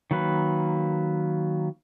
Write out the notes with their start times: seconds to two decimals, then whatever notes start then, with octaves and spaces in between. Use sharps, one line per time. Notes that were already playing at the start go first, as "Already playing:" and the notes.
0.11 D#3 F#3 A#3 B4